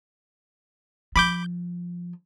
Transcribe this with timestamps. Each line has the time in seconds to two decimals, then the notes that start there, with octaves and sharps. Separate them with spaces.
1.16 F3 B5 D6 G6